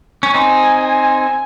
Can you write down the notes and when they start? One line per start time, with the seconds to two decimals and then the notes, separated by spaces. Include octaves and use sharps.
0.23 C#4
0.34 C4 D#4 G#5
0.86 G#5